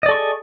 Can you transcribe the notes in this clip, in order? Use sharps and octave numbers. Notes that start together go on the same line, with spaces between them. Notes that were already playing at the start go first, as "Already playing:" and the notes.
G#4 A4 D5 D#5 C#6